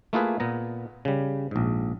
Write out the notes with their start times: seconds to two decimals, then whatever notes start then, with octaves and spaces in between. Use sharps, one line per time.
0.13 A3 A#3 E4 F4 G#4 B4
0.40 A#2 B3 A#5
1.05 C#3 G3
1.51 A#1 G#2